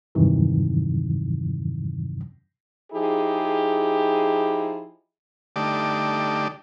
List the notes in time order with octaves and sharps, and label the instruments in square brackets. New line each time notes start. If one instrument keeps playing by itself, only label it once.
[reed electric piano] E2 G2 C3 D#3 E3 F#3
[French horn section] F3 D#4 E4 G4 G#4
[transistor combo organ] D3 A3 D#4 G4 D5